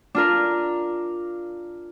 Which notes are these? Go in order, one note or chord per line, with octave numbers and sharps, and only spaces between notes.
D4 F4 A#4